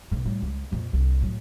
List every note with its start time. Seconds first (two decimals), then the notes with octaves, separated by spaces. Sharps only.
0.11 B1 C#3
0.26 A2 G3
0.42 C#2
0.71 F2 A#2
0.93 C2 D4
1.21 A2 F#3